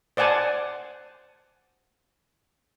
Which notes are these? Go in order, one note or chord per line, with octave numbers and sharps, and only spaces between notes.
C5 D5 F#5 G#5 A5